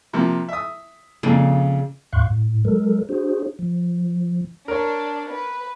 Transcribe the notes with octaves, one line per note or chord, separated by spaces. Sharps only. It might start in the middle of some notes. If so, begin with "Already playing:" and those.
C3 F3 A#3
E5 D#6
F2 A#2 C#3
D#2 A2 F5 C6 C#6 F#6
A2
F#3 G#3 A4 A#4
D4 F#4 G#4 C5
F3
D4 A#4 C#5
B4